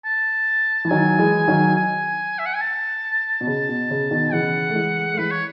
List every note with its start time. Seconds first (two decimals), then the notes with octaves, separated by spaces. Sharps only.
0.05 A5
0.85 E3
0.90 D#3 F#3 G#5
1.19 E3 G#3
1.48 D#3 F#3
1.76 G#5
2.39 E5
2.46 F#5
2.54 G#5
2.61 A5
3.41 B2
3.47 C#3 A5
3.69 B2
3.91 C#3
4.11 B2 D#3
4.33 C#3 E3 F#5
4.70 A3
4.75 E3 G#3
5.14 A3
5.18 E3 G#3 B4
5.31 C#5